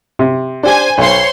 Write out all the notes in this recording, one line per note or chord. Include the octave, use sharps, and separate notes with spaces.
C3
D4 G4 C5 G#5
B1 C5 C#5 C6